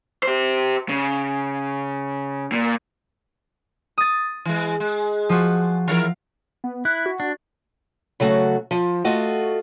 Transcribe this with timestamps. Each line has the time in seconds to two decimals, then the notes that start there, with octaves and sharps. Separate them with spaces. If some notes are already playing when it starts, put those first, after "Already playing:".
0.23 G4 C5
0.89 C#3
2.52 A#2
3.98 D#6 A6
4.45 E3 G#3
4.80 G#3
5.29 F3 F4 F#4
5.88 E3 E4 A#4 F5
6.64 B3
6.85 E4 F#6
7.06 F#4
7.20 D4
8.20 C#3 F#3 A3 F#4
8.71 F3
9.04 A3 F4 F#4 D#5